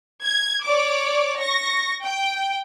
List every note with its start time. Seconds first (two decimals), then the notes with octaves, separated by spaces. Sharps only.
0.25 G#6
0.65 C#5 D5 D6
1.39 C#6 A#6
2.04 G5